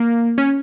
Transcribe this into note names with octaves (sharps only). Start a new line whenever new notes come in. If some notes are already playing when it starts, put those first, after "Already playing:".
Already playing: A#3
C#4